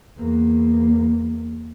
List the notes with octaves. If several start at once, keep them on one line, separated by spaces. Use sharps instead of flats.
E2 A#3